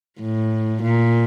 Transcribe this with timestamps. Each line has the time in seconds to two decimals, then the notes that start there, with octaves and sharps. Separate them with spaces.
0.20 A2
0.82 A#2